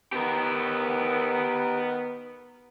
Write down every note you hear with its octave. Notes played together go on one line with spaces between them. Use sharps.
D#3 B3 G4 A#4